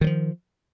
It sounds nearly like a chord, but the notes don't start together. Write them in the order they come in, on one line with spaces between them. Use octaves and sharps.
D#3 F#3 F3